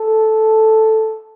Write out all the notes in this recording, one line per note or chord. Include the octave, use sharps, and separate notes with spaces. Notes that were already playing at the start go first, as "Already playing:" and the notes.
Already playing: A4